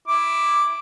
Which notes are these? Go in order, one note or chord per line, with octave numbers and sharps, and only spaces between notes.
E4 D6